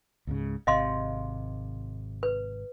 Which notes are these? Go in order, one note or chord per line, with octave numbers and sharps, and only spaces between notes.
C#2 G#2 C#3
G#1 C3 D#5 F5 C6
B4